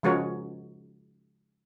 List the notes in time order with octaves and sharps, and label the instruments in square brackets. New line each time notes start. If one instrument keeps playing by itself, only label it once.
[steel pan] C#3 F3 G#3 F#4 A#4 C#5